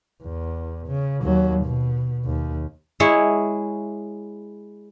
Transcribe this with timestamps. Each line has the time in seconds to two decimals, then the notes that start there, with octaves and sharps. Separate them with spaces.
0.22 E2
0.87 C#3
1.22 D#2 F#3
1.64 B2
2.25 D#2
3.00 G#3 E4 C#5